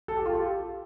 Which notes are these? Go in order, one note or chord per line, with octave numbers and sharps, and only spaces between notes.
A4
G4
F4
G4